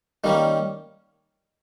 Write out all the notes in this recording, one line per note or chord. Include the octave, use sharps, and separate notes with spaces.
D#3 G3 A#3 C#4